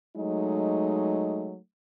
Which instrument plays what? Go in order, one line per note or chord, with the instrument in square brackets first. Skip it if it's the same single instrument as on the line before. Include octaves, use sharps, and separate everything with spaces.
[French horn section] F#3 G#3 A3 D#4